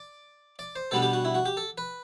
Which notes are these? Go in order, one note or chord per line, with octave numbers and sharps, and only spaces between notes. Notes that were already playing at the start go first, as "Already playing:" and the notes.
Already playing: D5
D5
C5
B2 G3 B3 D4 A4
G4
F#4
E4
F#4
G4
A4
B4